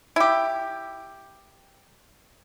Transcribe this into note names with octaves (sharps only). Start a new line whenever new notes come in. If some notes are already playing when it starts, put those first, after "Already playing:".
E4 G4